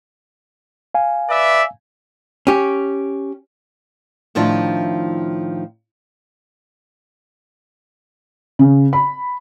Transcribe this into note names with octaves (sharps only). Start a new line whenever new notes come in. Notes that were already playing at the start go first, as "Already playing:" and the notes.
F5 G#5
B4 D5 E5
C#4 G4
A2 D#3 F3 D4 E4 F4
C#3
B5